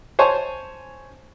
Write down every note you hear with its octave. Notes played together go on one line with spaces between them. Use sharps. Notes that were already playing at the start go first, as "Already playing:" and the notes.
C5 C#5 G#5 A5